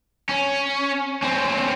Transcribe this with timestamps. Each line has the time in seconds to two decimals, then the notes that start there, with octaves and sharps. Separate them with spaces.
0.29 C#4
1.23 C4 C#4